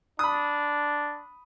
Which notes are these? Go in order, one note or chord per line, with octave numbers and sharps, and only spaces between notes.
D4 B5 D#6